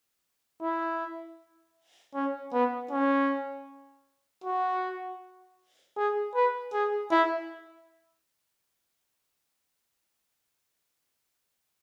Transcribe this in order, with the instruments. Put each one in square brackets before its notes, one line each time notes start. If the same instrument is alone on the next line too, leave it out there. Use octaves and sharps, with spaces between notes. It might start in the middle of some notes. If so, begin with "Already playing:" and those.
[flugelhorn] E4
C#4
B3
C#4
F#4
G#4
B4
G#4
E4